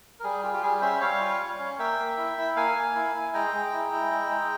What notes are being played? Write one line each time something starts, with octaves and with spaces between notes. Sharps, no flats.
A#4
G3 G#4
F4 G4
G4
G3 G#4
C#4 C5 E5
G3 C#5 F5
F4
G3
C#4
A#3 E5 G5
A#3
E4
E4
A#3 F5 G#5
A#3
E4
E4
G#3 G5 A#5
G#3
E4
E4
G#3
G#3